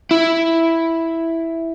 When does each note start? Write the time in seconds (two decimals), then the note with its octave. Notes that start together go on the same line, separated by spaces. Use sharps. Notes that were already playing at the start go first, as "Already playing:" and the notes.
0.11 E4